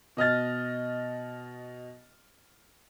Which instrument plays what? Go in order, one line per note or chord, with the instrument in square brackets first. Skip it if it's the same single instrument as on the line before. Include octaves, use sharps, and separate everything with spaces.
[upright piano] B2 D#5 F6 A6